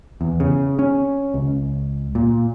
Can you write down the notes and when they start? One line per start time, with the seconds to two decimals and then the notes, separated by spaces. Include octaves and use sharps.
0.21 E2
0.40 C#3
0.79 C#4
1.34 C#2
2.15 A#2